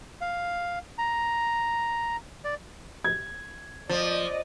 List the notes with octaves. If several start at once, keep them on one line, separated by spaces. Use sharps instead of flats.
F5
A#5
D5
G#6
F3 D5 D#5